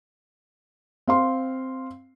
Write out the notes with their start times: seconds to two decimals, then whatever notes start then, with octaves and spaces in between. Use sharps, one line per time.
1.07 C4 F5 C6